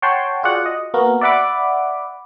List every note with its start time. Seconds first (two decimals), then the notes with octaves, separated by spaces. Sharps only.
0.02 C#5 F#5 G5 A5 C6
0.43 F4 F#4 G#4 D5 F#5
0.66 D#5
0.94 A#3 B3 F#4 A#4
1.21 D5 E5 F#5 B5 D6